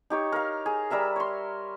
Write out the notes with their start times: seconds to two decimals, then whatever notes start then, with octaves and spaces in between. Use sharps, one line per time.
0.10 D#4 G4 C#5
0.32 A#4 F5
0.66 G#4
0.90 G3 A#4 E5 A#5
1.16 C#5 C6